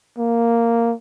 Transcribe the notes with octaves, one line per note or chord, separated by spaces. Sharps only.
A#3